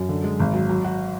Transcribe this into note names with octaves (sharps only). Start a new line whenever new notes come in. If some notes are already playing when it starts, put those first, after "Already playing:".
Already playing: F#2
D3
G#3
G#1
F#3
F#3
F#4